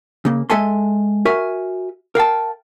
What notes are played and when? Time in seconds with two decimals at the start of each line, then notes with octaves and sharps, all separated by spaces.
0.25 C#3 A#3
0.50 G#3 A4 E5 G#5 A5 C6
1.25 F#4 A#4 E5 G#5
2.15 A#4 F5 G5 A5